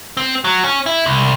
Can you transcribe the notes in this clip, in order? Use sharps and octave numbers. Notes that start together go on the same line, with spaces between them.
C4
F#3
C#4
E4
C2